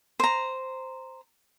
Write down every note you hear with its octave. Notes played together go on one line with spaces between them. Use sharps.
C5 A#5